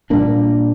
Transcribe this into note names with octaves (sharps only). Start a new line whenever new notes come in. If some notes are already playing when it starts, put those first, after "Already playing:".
A#2 G3 A#3 D4